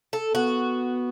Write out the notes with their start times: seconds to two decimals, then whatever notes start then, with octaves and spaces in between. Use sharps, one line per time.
0.13 A4
0.34 B3 F#4